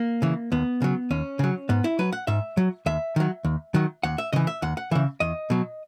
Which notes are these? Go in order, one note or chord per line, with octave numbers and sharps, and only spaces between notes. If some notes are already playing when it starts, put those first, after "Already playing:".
Already playing: A#3
C#3 E3
D#2 B3
C#3 F#3
D#2 C#4
C#3 F#3
G#2 B3
E4
F#3 B4
F#5
G#2 E5
F#3
D#2 E5
D#3 F#3
D#2
D#3 F#3
D#2 F#5
E5
C#3 E3 D#5
E5
D#2 F#5
F#5
C#3 E3 E5
E2 D#5
B2 F#3